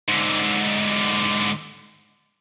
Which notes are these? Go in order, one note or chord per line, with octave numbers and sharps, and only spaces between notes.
G#2 D3